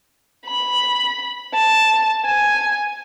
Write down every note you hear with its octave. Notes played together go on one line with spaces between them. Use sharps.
B5
A5
G#5